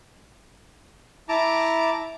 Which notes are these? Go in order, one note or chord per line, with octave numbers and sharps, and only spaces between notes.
E4 A5 A#5 D6